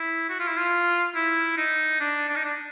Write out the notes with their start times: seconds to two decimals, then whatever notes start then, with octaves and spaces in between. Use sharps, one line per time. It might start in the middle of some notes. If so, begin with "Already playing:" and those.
Already playing: E4
0.29 F#4
0.40 F4
0.48 E4
0.58 F4
1.15 E4
1.57 D#4
2.00 D4
2.28 D4
2.36 D#4
2.44 D4